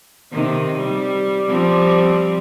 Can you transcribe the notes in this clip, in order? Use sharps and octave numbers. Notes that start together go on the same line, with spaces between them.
C3 D#3 D#4
G3
F3 G3 C4